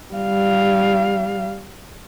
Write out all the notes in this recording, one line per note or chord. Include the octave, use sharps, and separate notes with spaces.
G3 F5